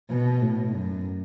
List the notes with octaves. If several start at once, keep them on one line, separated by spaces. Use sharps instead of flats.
B2
A2
F#2